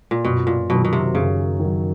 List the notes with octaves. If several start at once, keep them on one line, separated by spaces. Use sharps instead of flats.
A#2
F#2 B2
A#2
B2 D#3 F#3
B2
C3
F#2 C#3
D#3 F#3